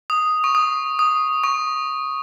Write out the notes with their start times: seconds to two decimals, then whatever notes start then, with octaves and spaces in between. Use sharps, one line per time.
0.10 D#6
0.44 C#6
0.55 D#6
0.99 D#6
1.44 C#6